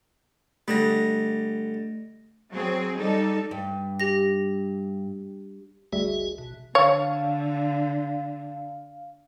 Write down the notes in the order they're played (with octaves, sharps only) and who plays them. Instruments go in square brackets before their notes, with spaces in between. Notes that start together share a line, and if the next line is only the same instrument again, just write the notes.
[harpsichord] D3 G3 [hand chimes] A3 A#6
[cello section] F#3 C4 G#4
G3 D#4 A4
[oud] G2
[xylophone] G4 A#6
[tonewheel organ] G#1 F#4 G#4 [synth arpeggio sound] D2 G3 E5
[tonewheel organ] A1 B2
[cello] D3 [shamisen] C#5 [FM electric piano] F5